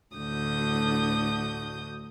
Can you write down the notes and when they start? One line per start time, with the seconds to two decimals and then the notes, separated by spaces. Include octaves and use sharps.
0.14 D2 A2 D3 F#4 D#6 G6